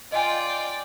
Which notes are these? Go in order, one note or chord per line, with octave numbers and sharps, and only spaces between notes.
F4 D5 D#5 G5 G#5